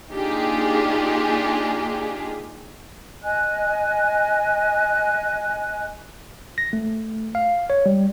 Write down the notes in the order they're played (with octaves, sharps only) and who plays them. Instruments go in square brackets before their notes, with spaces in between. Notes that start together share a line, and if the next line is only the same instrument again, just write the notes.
[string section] A#3 D4 D#4 F4 G4 G#4
[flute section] D#5 G#5 F#6
[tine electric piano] A#6
A3
F5
C#5
G3